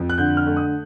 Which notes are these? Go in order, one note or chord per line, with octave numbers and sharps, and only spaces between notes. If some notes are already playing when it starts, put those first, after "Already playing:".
Already playing: F2 F3
F#6
D3 G6
F6
A3
D#6